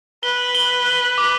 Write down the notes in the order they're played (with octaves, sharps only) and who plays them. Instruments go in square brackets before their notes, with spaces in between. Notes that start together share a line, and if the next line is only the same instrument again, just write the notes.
[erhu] B4 [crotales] G7
[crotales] G7
G7
D6